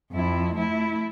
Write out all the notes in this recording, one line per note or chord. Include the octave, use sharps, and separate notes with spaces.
F2 E4
A3 E4